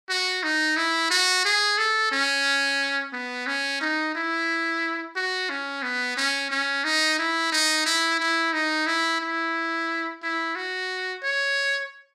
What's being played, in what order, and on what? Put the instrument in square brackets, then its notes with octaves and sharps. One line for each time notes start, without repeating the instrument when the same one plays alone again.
[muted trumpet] F#4
D#4
E4
F#4
G#4
A4
C#4
B3
C#4
D#4
E4
F#4
C#4
B3
C#4
C#4
D#4
E4
D#4
E4
E4
D#4
E4
E4
E4
F#4
C#5